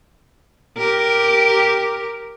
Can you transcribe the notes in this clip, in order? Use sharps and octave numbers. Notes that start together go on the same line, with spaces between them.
G4 A#4